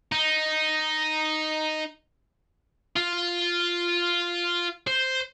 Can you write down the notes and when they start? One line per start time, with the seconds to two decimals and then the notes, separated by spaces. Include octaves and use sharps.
0.12 D#4
2.96 F4
4.87 C5